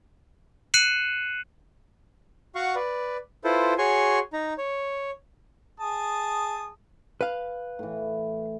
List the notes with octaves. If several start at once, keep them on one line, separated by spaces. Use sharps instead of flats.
F#6 C7 C#7 D#7 E7 F#7
F#4 F5 F#5 C#6
B4 D5
E4 F4 A4 B4 C5
F#4 G#4 C#5 G#5 C6 C#6
D#4 A#5
C#5
G#4 A5 D#6
B4 F5
A2 E3